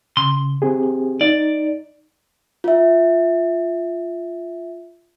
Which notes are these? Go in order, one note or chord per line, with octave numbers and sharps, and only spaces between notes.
C#3 C6
C4 G4 G#4
D#4 D5
F4 E5